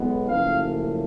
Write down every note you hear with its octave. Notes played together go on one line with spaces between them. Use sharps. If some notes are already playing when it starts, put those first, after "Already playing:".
Already playing: B1 B2 G#3 B3
F#1 F#2 F3 A3 F5